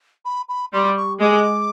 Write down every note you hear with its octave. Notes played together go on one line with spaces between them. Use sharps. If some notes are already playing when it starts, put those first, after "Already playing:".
B5
B5
G3 C6
C#6
G#3 D6